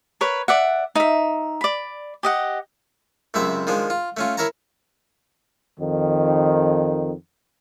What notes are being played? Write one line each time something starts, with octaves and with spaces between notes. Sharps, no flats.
A#4 B4 C#5
D5 E5 F#5
D#4 E5
D5 B5
G4 D#5 F#5
C#2 F#2 C3 C4 E5
D#3 F3 G#3 D4
F4
A3 C#4 F4
E4 A#4 C#5 A5 A#5
F2 D#3